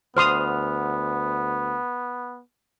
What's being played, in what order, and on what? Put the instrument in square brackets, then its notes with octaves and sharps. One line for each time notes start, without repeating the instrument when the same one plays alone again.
[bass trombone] D2 [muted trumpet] B3 [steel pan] C5 C6 D#6 [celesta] F6 F7